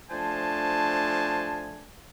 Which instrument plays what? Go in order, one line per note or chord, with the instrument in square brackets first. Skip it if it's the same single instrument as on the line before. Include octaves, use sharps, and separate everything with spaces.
[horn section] F3 A3 D4 C5 G#5 A5